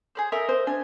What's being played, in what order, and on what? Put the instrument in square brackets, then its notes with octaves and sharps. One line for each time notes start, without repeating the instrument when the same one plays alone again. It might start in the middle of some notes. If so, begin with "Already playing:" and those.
[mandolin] G#4 B4 C5
[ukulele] A4 E5 [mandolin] A#4 D#5
[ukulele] C5
[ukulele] D4 [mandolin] G#5